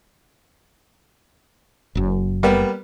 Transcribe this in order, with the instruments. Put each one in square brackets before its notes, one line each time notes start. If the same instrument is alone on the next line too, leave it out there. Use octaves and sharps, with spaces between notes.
[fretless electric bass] F#1 F#2
[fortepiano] G3 A#3 B3